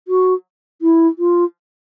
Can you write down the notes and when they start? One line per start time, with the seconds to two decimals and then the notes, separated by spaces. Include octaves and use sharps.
0.08 F#4
0.81 E4
1.18 F4